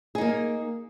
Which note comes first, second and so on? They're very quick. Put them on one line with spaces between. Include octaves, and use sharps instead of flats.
G#4 D#4 A#3